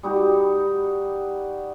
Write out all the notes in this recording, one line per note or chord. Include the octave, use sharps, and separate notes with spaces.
G3 D#4 F#4